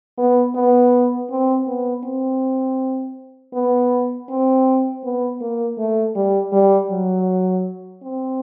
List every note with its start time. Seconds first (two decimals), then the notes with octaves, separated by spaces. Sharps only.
0.18 B3
0.55 B3
1.30 C4
1.68 B3
2.04 C4
3.54 B3
4.29 C4
5.04 B3
5.41 A#3
5.78 A3
6.16 G3
6.53 G3
6.91 F#3
8.02 C4